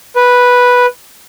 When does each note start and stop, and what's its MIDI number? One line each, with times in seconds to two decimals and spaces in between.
0.16 0.86 71